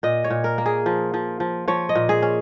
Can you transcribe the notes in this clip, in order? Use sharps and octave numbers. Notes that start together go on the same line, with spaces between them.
A#2 D#5
C#5
A#2
A#4
A#3
G#4
F3
F3
F3
F3 C#5
D#5
A#2
G#4
C#4